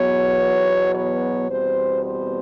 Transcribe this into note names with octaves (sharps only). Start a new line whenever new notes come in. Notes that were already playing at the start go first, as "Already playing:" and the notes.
Already playing: E2 B2 F#3 B3 C#5
C#5
E2 B2 G3 C4 C5
C5